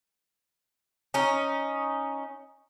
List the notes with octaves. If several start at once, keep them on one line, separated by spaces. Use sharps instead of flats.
C#4 D#4